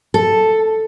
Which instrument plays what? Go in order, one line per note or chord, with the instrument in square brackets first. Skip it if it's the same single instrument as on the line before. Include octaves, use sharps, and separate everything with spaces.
[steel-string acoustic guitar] A4